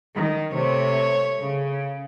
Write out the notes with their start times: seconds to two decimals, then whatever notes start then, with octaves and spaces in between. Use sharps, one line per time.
0.16 D#3
0.55 C3 A3 C#5
1.40 C#3